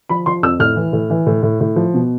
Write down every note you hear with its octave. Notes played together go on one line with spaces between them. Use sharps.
F3 B5
F3 C6
F2 E6
A2 F6
E3
A2
E3
A2
A2
A2
F3
B2